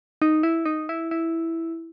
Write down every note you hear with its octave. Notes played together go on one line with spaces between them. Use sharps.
D#4
E4
D#4
E4
E4